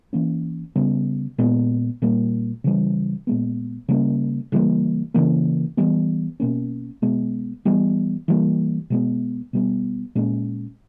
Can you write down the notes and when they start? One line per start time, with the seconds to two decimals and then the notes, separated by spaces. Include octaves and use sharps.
0.13 E3 A#3 C#4
0.76 C#3 G3 B3
1.38 A#2 G#3 B3
2.02 A#2 G3 A#3
2.64 C#3 E3 G3
3.27 A#2 G#3 B3
3.88 C#3 G3 A#3 C#4
4.52 C#3 E3 G3 A#3
5.14 C#3 E3 A#3
5.77 E3 G3 B3
6.40 B2 A#3 C#4
7.02 B2 G#3 B3
7.65 E3 G3 B3
8.28 E3 G3 A#3
8.90 B2 G#3 B3
9.53 B2 G3 B3
10.15 A#2 G#3 C#4